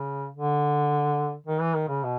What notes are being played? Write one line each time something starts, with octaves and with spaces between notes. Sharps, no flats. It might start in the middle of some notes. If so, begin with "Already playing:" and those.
Already playing: C#3
D3
D#3
E3
D#3
C#3
B2